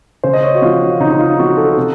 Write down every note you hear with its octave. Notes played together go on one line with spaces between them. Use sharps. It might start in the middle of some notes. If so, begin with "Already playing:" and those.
C#3 C5
D#5
C#5
F#4
F3 C4 F4
F4
C#3 D#4
D#4
F4
F3 C4 F#4
A4
C3